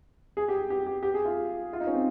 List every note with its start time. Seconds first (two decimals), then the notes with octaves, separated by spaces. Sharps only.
0.37 G#4
0.48 G4
0.70 G4
0.86 G4
1.03 G4
1.14 G#4
1.25 F4
1.73 F4
1.80 D#4
1.87 C#4
1.94 C4